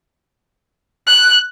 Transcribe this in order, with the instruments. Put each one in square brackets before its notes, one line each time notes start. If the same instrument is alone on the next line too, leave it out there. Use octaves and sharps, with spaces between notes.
[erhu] F#6